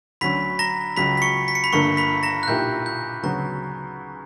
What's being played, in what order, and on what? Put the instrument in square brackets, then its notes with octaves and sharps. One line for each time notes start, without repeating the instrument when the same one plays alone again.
[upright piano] D2 D3 F#3 C#4 [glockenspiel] B5 B6
[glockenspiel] A#5 A#6
[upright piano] C#2 C#3 F#3 [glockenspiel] B5 B6
[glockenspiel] B6
C#6 C#7
B6
C#7
B5 B6
[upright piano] G1 G2 D3 A#3 [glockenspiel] C#6 C#7
[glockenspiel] B5 B6
A#5 A#6
F#6
[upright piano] B1 A#2 A#3 E4 G4 [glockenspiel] G6
[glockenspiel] G6
[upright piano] D2 C#3 F#3 B3 [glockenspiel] A#5